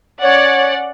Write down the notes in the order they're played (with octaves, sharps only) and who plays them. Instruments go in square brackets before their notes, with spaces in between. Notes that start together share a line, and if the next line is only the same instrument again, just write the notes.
[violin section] C#4 D5 F#5 [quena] C#5